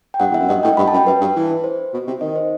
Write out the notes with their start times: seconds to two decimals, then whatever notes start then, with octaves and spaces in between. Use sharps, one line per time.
0.14 G5
0.20 G2 F#5
0.30 E2
0.34 E5
0.39 F#2
0.49 G2 D#5
0.63 A2 G5
0.77 G2 B5
0.88 A5
0.93 F#2
0.96 G5
1.07 F#2 B4
1.21 G2
1.36 E3
1.64 C5
1.93 B2
2.07 C3
2.21 D#3 D#5
2.36 C5